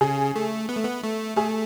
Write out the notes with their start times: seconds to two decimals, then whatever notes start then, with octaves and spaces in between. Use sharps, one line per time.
0.01 C#3 G#4
0.36 A3
0.69 B3
0.77 A3
0.84 B3
1.02 A3
1.37 A3 G#4